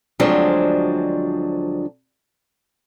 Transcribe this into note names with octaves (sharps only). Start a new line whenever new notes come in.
D2 F3 F#3 G#3 C4 D4